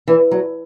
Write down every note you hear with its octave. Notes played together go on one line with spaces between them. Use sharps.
E3
F#3